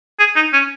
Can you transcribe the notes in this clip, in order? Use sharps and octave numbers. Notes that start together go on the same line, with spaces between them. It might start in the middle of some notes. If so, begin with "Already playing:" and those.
G#4
D#4
C#4